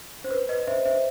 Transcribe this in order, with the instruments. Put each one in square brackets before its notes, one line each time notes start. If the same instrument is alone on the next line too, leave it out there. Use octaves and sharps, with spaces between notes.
[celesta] C5
B4
B4 D#5
C5 E5
C5 E5